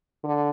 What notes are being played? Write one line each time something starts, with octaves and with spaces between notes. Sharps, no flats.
D3